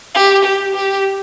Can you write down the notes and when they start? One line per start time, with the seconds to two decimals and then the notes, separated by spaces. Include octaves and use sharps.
0.14 G4
0.45 G4
0.75 G4